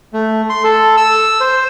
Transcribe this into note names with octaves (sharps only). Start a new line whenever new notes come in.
A3
C6
A4
E6
C5